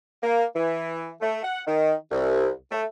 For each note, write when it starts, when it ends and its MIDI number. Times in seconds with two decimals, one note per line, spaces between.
0.23 0.44 58
0.56 1.12 52
1.21 1.40 57
1.43 1.61 78
1.67 1.94 51
2.11 2.50 36
2.71 2.83 57